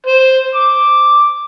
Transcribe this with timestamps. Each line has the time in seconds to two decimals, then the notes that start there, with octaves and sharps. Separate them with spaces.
0.07 C5
0.55 D6